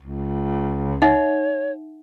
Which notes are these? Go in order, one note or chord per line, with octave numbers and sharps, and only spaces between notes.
C#2
D#4 C#5 E5 F#5